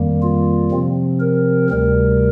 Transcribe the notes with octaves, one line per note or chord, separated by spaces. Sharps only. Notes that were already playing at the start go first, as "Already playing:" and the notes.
Already playing: F2 D#3 G3 A#3
F4
C3 F3 C4
A#4
D2 C3 G3 A#4